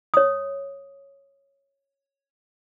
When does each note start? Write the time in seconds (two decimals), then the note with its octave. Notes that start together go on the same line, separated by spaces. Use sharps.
0.14 C#5 D#6